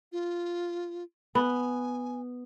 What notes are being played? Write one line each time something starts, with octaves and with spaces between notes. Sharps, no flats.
F4
B3 G#5